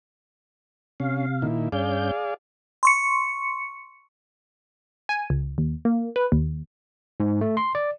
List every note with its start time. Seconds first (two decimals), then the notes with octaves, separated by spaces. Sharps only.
1.00 C3 C#4 F5
1.42 A#2 D#3 E4
1.72 G2 C#4 G#4 D5 F5 G6
2.83 C6 C#6 C#7
5.09 G#5
5.30 C#2
5.58 D#2
5.85 A#3
6.16 B4
6.32 D#2
7.20 G#2
7.41 A3
7.57 C6
7.75 D5